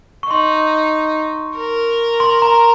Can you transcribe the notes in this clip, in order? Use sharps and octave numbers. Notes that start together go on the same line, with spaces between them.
C#6
D#4 C6
A#4
C6
A#5